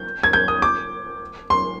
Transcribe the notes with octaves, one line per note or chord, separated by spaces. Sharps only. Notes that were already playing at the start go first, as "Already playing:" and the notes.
Already playing: G6
G#6
G6
D#6
D6
C6